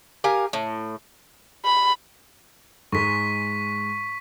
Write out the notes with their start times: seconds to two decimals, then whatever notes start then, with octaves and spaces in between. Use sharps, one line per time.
0.24 G4 A#4 F5 G#5
0.53 A2
1.65 B5
2.92 G#2 G#3 C#6 B6